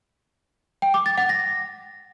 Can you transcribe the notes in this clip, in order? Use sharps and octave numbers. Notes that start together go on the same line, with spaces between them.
G5
D6
A6
F#5
A#6